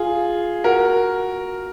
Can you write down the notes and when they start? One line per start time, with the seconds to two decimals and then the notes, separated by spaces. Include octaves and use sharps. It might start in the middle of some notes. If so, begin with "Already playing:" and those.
Already playing: F4 G#4
0.64 F#4 A#4